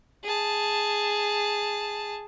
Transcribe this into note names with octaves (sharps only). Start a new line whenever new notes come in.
G#4 A5